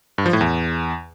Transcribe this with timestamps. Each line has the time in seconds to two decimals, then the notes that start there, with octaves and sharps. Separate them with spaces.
0.18 G2
0.26 F3
0.33 A2
0.41 E2